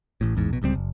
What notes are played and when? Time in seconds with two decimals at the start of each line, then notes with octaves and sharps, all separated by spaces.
0.21 A1 A2
0.35 A1 E2 G#2
0.49 A#1 B2
0.62 D1 C#2 G3 C4
0.74 F#1